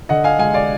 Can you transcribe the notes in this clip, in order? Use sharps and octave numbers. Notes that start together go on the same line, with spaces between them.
D3 D#5 F#5
F5 G#5
G#3 F5 G#5
D5 F5